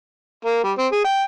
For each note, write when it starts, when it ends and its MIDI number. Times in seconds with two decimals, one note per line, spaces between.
0.45 0.63 58
0.64 0.73 55
0.78 0.87 60
0.92 1.01 68
1.05 1.23 79